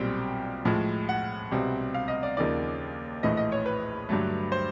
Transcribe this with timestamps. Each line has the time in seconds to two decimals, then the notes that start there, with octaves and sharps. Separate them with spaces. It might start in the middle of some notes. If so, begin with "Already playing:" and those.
Already playing: B1 A#2 G3 C4 G5
0.65 A2 F3 G#3
1.09 F#5
1.51 C2 B2 G3 C4
1.94 F5
2.08 D#5
2.23 D5
2.37 D#2 C#3 F3 A#3 D#4 D5
3.23 A#1 A2 E3 A3 D#5
3.37 D#5
3.52 C#5
3.66 B4
4.09 G2 D3 F#3 A3
4.52 C5